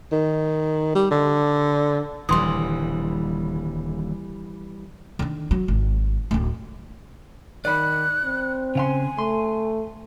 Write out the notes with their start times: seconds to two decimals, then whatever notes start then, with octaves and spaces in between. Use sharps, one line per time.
0.12 D#3
0.95 G3
1.11 D3
2.29 D#1 D3 E3 G3 C6 D#6
5.19 D3 D#3
5.51 F#3
5.68 G#1
6.31 D1 G#1
7.65 D#3 D5 B5 F#6
8.25 C4
8.75 C#3 F5 G#5 C6
9.19 A3 C6